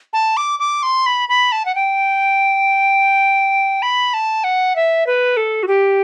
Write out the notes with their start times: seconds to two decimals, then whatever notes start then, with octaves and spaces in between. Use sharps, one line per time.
0.13 A5
0.37 D6
0.59 D6
0.83 C6
1.06 B5
1.29 B5
1.52 A5
1.65 F#5
1.75 G5
3.82 B5
4.14 A5
4.44 F#5
4.76 E5
5.07 B4
5.37 A4
5.63 F#4
5.68 G4